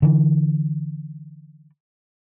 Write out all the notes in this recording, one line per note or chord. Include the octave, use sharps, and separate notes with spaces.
D3 E3